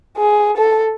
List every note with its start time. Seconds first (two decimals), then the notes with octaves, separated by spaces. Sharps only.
0.17 G#4
0.57 A4